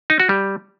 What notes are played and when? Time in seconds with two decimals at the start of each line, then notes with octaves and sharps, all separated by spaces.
0.10 D#4
0.20 F#4
0.29 G3